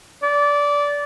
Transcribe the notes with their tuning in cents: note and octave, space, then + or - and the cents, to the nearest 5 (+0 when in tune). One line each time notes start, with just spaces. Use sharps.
D5 -20